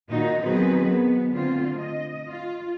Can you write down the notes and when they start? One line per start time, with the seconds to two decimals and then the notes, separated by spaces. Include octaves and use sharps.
0.10 A#2 D#3 D#4 F#4
0.42 D#3 F#3 B3 C4 G#4 B4
0.88 B3
1.32 D3 A3 C4 F4
1.78 D#5
2.29 F4